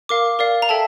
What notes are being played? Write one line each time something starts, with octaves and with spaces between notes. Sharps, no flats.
A#4 F5 D6
A#4 D5 F5
A#5
A4 E5 G5 A5